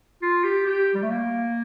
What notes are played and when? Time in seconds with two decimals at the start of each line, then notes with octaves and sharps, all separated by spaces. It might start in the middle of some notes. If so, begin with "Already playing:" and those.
0.22 F4
0.44 G4
0.66 G4
0.94 G3
1.02 A3
1.10 A#3